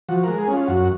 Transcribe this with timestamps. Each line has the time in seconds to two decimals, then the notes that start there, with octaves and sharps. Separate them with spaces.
0.09 F3 F#4
0.24 G#3 A#4
0.38 G#4
0.48 C#4
0.53 F4
0.67 F#2 F#4